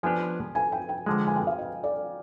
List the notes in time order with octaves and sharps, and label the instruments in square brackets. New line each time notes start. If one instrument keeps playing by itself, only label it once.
[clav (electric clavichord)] F3 B3 D4 G4 B4 [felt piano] G#5
[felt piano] G#5
G5
G5
[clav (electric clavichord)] D3 F3 G#3
[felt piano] G#5
G5
F5
D#5
D5